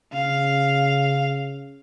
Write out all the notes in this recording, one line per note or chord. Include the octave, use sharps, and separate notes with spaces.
C#3 F5